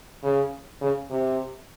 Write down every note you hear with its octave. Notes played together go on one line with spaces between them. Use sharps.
C#3
C#3
C3